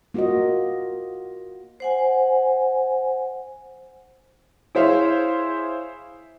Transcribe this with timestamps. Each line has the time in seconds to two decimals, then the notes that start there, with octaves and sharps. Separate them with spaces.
0.14 A#3 F4 F#4 A#4 D#5
1.80 C5 F#5 G#5
4.75 E4 G#4 C5 C#5 E5 F5